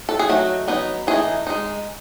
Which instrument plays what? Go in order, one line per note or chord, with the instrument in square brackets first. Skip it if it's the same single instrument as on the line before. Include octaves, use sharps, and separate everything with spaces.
[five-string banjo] A4
G#4
F#3 A3 D#4 F#4
F#3 B3 D#4
E3 A3 D#4 G#4
G#3 D#4